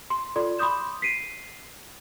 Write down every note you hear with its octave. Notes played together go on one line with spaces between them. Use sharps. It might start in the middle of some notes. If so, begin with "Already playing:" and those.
C6
F4 A4 D5 C6
B5 C6 D6 D#6 G6 E7
B6 C7 D7 D#7